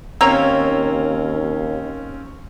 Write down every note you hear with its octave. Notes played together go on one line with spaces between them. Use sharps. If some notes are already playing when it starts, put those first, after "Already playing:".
D#2 A#3 C4 C#4 C#5 F5 A#5 E6